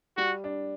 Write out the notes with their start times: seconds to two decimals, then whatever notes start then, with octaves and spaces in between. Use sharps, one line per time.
0.17 G3 F#4
0.44 D4